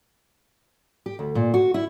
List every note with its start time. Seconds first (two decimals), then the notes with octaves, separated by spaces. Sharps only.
1.06 G4
1.19 D2
1.35 A#2
1.54 F#4
1.74 E4